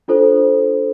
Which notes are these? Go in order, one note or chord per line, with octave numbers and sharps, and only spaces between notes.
D4 F4 A4 C5